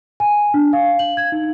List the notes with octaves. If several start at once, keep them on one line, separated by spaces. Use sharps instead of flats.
G#5
D4
F5
F#7
G#6
D#4